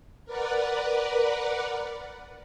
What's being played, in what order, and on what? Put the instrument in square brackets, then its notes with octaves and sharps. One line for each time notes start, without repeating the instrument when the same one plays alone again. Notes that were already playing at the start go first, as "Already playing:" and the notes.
[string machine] A#4 B4 D5 F#5